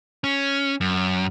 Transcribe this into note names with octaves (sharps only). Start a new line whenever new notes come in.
C#4
F#2